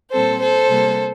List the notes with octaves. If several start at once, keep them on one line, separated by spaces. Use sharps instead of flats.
A#2 G3 C4 A4 C5
A4 C5
C3 G3 A#3